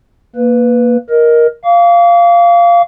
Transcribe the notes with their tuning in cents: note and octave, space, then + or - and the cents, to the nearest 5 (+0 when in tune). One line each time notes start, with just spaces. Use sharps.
A#3 +5 B4 +0
A#4 +10 D#5 +5
F5 -10 D6 -40